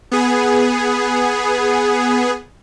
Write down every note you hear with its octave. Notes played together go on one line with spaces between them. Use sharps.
B3 G#4